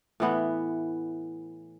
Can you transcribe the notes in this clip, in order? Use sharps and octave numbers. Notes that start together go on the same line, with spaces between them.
A2 E3 B3